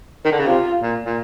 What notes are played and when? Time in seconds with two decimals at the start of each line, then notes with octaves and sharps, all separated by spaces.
0.25 D#3
0.32 D3
0.39 C#3
0.47 C3 F4
0.82 A#2
1.06 A#2